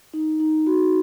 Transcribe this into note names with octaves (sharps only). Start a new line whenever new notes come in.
D#4
D#4
F#4